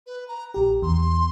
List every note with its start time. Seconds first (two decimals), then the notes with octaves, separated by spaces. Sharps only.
0.07 B4
0.28 A#5
0.54 A#1 G4 A#5
0.82 E2 C6